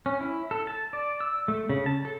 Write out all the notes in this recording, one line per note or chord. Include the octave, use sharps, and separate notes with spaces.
C#4
E4
A4
A5
D5
E6
A3
C#3
A5
A4